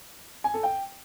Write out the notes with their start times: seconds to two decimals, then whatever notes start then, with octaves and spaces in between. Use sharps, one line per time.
0.44 G#5
0.54 A4
0.63 G5